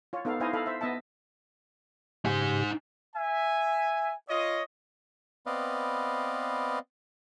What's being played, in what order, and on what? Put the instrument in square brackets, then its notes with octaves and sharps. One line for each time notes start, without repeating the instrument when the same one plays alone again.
[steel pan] F4 C#5
B3 D#4 A4 F5
D#4 E4 C5 D#5 F5 G#5
A4 D#5 F5 B5
C5 E5
B3 D#5 E5 A5
[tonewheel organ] G#2 C#3 G4 [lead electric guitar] D#4 G#5
[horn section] E5 G#5
F4 C#5 D#5
[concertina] B3 C4 B4 D5 D#5 F5